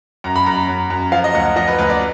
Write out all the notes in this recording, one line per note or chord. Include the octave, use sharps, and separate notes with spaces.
F#2 A#5
B5
F#2 A#5
F#2
F#2
F3 F5
D#5
D2 F#5
F#5
F3 D#5
B4
D2 B4
D5